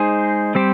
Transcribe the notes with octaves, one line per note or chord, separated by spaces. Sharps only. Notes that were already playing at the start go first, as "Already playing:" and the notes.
Already playing: G#3 D#4 G#4 C5
G3 C4 G4 C5